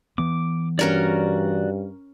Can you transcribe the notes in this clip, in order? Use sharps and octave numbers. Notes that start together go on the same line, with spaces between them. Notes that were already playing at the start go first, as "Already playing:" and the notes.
E3 B3 D6
G2 C#4 F#4 A#4 C#5 D5